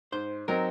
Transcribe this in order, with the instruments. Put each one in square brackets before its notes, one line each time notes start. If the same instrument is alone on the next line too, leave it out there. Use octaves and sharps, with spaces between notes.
[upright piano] G#2 [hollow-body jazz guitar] C5
[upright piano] F#3 C4 D#4 [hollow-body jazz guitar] A#4